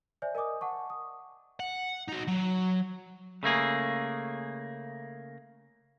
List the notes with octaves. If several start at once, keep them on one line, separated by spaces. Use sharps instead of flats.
C5 D5 E5 G#5
A#4 D#5 G#5 D6 D#6
F#5 A5 C#6 D6
D#6
F#5
D#4 F#4
F#3
C#3 A3 A#3 G#4